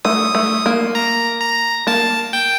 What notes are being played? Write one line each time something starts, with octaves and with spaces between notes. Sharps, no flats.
A3 D#6
A3
A#3
A#5
A#5
A#3 A5
G5